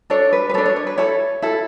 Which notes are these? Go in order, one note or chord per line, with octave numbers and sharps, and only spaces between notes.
D4 A4 C#5
B4
B4
D4 A4 C#5
C#5
C#5
B4
E4 A4 C#5
E4 A4